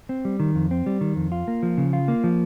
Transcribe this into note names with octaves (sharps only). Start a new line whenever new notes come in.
C4
G3
D#3
F2
C4
G3
D#3
F2
F4
A#3
F3
C#3
F4
A#3
F3